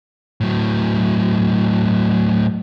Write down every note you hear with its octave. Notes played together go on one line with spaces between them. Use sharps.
A2 F#3